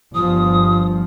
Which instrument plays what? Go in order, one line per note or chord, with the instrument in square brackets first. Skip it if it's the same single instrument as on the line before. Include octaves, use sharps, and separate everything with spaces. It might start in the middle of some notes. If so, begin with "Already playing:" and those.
[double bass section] G1 F3 [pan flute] D#6